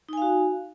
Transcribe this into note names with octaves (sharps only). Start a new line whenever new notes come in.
D#4 F#4 F5 G#5